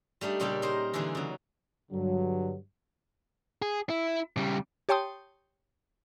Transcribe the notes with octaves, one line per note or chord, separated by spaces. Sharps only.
G3 A3 D4 D#4
A#2 C#3 G3 D4 A4 G5
D#4 A#4 C5
D3 E3 G#3 D4 D#4
C#3 F#3
G2 D3 F#3
G#4
E4
C#3 G3
G4 C#5 G5 A5 C6 D#6